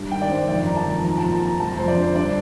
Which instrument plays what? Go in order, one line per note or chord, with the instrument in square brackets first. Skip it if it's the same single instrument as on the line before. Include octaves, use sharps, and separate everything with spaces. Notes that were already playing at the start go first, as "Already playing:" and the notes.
Already playing: [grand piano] G2
D#3 G5
D5
G2 C5
F2 D5
D#3 A#5
A5
F2
F3 A#5
A5
A#2
A5
F3 A#5
F2 A5
F2 C5
D5
D3
C5
G2 D5